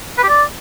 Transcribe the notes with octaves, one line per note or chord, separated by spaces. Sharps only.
B4
G4
D5